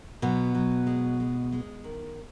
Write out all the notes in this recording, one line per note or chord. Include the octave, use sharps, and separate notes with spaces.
B2 F#3 B3
F#3
G#3
G#3
G#3
D#3